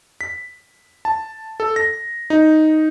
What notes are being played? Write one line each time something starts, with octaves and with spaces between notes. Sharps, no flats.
B6
A5
A4
A#6
D#4